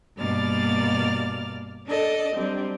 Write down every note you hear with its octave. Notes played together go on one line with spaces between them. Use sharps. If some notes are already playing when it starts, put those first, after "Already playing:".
G2 B2 A#3 D5 F6 A6
D4 A4 D5 D#5
F#3 G3 C4 D4